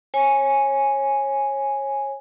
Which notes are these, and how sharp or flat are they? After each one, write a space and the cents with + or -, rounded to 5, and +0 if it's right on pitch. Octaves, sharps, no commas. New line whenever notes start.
C#5 -30 G#5 +0